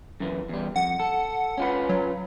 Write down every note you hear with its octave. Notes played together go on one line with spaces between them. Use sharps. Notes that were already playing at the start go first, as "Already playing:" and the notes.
F#2 E3
E2 G3
F2 F#5
A4
C#4 F4 B4
F#3